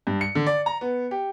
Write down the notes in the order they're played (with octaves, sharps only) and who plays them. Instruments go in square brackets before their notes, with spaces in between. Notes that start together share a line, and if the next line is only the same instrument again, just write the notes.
[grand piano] G2
C#7
D3
D5
A#5
B3
G4